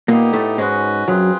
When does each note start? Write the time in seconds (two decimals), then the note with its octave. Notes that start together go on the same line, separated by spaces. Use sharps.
0.08 A#2 A#3 B3 D#4 G4
0.33 A2 A3
0.58 G#2 G#3 C#4 F#4 B4
1.08 F#2 F#3 C4 F4 G#4 B4